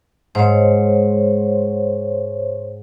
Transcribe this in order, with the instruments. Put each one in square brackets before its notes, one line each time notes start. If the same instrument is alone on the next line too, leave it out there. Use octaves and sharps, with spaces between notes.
[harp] G#2 [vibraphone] C5 C#5